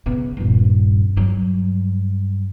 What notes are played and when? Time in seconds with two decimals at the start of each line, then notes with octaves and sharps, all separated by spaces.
0.06 C#3 B3
0.37 D#1 G2
1.16 G2 F#3